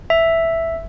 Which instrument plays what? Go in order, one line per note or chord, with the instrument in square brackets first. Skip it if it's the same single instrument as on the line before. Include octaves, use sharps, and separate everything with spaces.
[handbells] E5